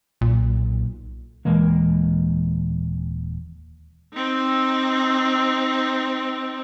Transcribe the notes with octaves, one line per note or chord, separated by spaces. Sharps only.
B1 A#2
D#1 E3 G#3 A#3
C4 D#4